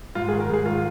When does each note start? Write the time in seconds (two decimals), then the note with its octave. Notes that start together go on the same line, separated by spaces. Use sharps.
0.15 G#2 F4
0.28 G#4
0.32 D#3
0.40 A#4
0.50 G#2 G#4
0.66 D#3 F4